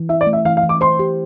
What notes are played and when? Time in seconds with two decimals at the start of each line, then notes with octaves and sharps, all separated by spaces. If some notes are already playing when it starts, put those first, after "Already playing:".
Already playing: E3
0.09 E4 E5
0.21 D5
0.26 A3
0.33 E5
0.45 E3 F5
0.57 F5
0.63 E3
0.69 D6
0.81 C5 C6
0.99 G4